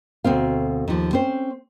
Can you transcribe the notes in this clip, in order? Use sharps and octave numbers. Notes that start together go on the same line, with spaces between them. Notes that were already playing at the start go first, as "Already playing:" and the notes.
D2 B2 C4 F5
D#2 F3
C4 C#4 C5